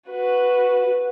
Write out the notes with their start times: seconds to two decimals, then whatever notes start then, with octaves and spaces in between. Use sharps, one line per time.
0.10 F#4 B4